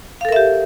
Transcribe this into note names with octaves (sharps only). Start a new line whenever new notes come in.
G4 A4 A#4 E5 F5